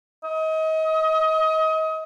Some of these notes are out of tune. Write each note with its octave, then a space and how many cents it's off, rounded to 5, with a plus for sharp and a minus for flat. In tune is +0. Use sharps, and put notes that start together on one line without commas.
D#5 +30